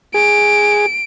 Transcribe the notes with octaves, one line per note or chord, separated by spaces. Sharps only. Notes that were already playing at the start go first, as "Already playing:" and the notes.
G#4 D7